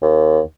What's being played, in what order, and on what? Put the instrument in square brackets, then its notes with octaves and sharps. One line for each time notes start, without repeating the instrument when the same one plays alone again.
[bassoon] D#2